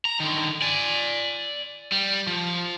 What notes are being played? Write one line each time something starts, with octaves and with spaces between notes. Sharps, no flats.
A#5
D3 D#3
D5 G#5
G3
F3